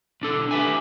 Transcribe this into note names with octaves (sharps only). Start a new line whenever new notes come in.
B1 D4 A4
G4 B4 E5 G#5